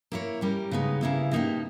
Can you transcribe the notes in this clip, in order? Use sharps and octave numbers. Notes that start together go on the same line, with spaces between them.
A#3 E4 A#4 C#5
G3 C#4 G4 A#4
C#3 G#3 B3 D#4
C#3 G3 A#3 E4
B2 A#3 D#4 G4